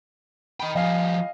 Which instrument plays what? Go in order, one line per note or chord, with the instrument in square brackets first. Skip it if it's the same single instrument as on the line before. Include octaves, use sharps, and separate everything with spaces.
[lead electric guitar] D#5 G5 [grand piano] B5
[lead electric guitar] F3 G3 [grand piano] D#5 F5 G#5